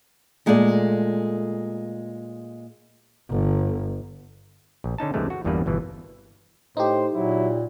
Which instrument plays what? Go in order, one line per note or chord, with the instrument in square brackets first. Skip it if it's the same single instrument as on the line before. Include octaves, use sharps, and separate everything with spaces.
[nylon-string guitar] A#2 G#3 A3 A4 C#5 D5
[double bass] G1
[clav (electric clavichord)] A#1
D3 C#4 D#4 A5
C#2 G2 C3 E3 G#3 A3
F#4
G1 E2 G2 G3 A#3 B4
G1 B2 E3
[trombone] A2 [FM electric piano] D#4 G4 [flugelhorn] C5
[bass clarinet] A#2 [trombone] F#3 [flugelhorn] E4